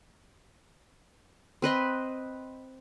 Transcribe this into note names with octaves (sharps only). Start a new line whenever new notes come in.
C4 B4 D#5 C6